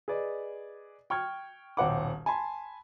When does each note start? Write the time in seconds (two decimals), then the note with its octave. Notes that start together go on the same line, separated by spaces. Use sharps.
0.08 G#4 B4 D5 D#5
1.10 G5 C#6 F6 G#6
1.77 D#1 B1 C5 F#5 G5 D6
2.26 G#5 A5 B5 C6